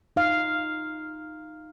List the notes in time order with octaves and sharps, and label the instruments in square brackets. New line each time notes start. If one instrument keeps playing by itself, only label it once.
[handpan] D#4 F5